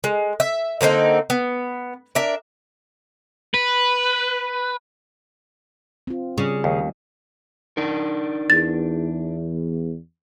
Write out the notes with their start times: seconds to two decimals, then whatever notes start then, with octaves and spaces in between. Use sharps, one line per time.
0.04 G#3
0.40 E5
0.81 D3 A#3 C4 D#4
1.30 B3
2.15 D4 A#4 E5
3.54 B4
6.07 C4 F4
6.38 C#3 G3 C#4 D5
6.64 D#2 D#3 A3
7.77 D4 D#4 A#4
8.50 E2 A6